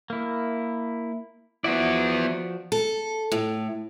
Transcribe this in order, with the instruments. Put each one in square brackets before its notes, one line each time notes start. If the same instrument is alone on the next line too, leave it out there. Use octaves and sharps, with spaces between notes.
[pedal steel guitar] A#3 E4
[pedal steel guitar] F3 F#4 D5 [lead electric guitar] B3 E4
[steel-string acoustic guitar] A4
A2